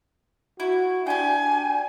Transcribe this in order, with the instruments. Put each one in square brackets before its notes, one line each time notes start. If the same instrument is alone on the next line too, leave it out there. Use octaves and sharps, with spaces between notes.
[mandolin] E4 [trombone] F#4
[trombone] D4 [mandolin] G4 G5 [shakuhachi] G#5